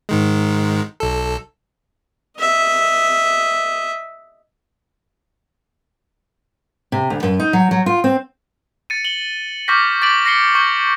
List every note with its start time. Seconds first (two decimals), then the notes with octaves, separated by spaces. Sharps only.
0.09 G#2 D#3 G#3
1.00 B1 A4
2.39 D#5 E5
6.92 C3
7.10 D2
7.23 F#2
7.40 D#4
7.53 F#3
7.71 F#3
7.86 F4
8.04 C4
8.90 A6 C#7 D#7
9.05 F#7 G7
9.68 C#6 D6 F6 G6 A#6 B6
10.02 D6 A6 B6 D7 F#7
10.26 A#6 C7 C#7 G7
10.55 C#6 G6 A#6 G7